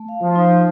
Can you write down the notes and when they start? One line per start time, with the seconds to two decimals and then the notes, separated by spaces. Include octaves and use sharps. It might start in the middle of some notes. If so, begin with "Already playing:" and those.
Already playing: A3
0.08 F5
0.22 F3
0.36 D#4